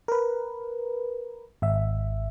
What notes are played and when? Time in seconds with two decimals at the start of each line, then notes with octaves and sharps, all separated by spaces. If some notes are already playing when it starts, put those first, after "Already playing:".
0.08 A#4 B4
1.62 G#1 E5